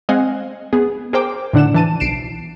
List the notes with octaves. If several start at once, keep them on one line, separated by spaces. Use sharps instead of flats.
G#3 C4 D#5 F5 F#5 G#5
B3 G#4
G#4 A#4 C5 G5 D6
A2 D3 D4 F#5 E7
E3 A5 D#7
B1 C7 D7 E7